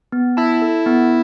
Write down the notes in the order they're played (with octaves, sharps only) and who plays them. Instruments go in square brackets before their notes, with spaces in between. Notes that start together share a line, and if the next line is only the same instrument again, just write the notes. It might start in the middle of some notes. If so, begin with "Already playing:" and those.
[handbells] B3
[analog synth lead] E4 [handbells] A5
[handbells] A4
B3